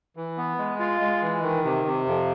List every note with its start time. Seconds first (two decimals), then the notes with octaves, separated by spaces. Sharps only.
0.16 E3
0.38 B3
0.58 G#3
0.79 F4
1.01 G#3
1.22 E3
1.43 D#3
1.64 C3
1.85 C3
2.06 F2